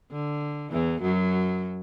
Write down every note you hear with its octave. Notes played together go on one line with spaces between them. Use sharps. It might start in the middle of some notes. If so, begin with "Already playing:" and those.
D3
E2 E3
F#2 F#3